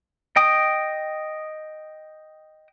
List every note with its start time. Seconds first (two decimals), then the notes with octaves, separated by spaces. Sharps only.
0.36 D#5 G5 D#6